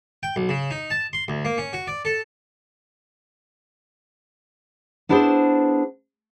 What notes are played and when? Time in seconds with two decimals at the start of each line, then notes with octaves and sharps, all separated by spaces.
0.23 G5
0.36 B1
0.49 C#3
0.71 D#4
0.90 A5
1.13 C6
1.28 D2
1.45 A#3
1.58 C#4
1.73 F#4
1.87 D5
2.05 A4
5.09 B3 D4 E4 G#4 B4 C5